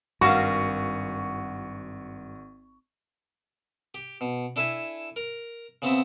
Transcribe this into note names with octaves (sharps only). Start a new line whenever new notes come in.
G#1 G2 F#4 A#4 F5 F#5 C#6
G4
B2
D4 E4 A4 E5 G#5
A#4
C#3 B3 C4 E5